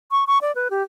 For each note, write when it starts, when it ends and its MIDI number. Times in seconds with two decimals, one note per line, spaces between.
0.11 0.24 85
0.27 0.38 85
0.41 0.54 74
0.55 0.68 71
0.70 0.83 67